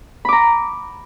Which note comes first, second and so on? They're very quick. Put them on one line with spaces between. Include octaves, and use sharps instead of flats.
B5 D6 A#5